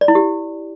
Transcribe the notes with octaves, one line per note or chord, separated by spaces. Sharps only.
D5
E4
G4